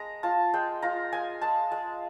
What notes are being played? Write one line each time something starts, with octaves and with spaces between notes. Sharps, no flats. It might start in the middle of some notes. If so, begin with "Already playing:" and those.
Already playing: G#3 A#5
F4 A5
G#3 G5
F4 A#5
G#3 G#5
G#3 A5
G#3